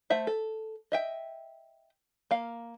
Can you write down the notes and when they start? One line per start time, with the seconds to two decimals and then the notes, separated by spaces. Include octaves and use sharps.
0.10 A3 C5 E5 F#5
0.27 A4
0.92 D#5 E5 G5
2.31 A#3 F5